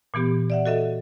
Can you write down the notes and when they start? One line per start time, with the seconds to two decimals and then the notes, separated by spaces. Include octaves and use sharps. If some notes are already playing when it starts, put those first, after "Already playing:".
0.14 A#2 E3 B3 G4
0.50 D5 E5 F#5
0.66 F#4 A4 D#5 E5